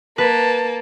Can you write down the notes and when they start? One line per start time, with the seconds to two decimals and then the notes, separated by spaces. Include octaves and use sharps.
0.18 A#3 B4 A5